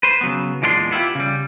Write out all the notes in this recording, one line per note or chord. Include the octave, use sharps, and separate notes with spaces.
B4 C5
C#3 F#3 B3
E2 A#2 G#3 D4 G4 C6
B3 E4 F4 G4
C#3 G3